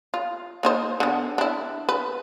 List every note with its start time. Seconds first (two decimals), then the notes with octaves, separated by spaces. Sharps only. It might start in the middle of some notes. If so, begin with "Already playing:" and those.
0.14 F4
0.63 A#3 D#4 C5
1.00 D3 B3
1.38 D4 E4
1.89 B4